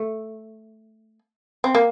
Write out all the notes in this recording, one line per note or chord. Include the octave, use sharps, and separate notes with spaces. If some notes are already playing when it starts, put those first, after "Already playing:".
Already playing: A3
C4
A#3